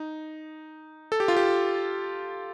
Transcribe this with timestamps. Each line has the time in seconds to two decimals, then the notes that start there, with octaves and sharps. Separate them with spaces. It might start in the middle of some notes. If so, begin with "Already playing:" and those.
Already playing: D#4
1.12 A4
1.20 G4
1.28 F4
1.36 G4